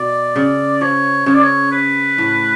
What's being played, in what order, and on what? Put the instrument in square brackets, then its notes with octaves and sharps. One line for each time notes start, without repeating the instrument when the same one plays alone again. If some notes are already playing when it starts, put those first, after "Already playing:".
Already playing: [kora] B2 [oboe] D5
[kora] C#3 [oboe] D5
[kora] F3 [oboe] C#5
[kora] C#3 [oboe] C#5
[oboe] D5
C#5
B4
[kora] A2